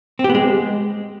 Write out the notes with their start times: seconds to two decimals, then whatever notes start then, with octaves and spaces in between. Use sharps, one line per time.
0.19 C4
0.24 G4
0.29 B3
0.35 G#3